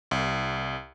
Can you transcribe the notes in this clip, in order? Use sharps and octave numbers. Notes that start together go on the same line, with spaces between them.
C2